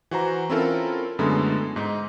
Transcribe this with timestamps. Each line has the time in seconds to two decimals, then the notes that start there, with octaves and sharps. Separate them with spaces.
0.11 E3 F#4 C5 A#5
0.50 C4 C#4 E4 F4 A4 A#4
1.19 F#2 D3 G#3 A3 B3 E4
1.76 G#2 D#4